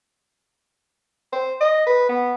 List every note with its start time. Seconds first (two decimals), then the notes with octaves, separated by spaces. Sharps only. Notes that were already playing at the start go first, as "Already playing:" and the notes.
1.33 C5
1.61 D#5
1.87 B4
2.09 B3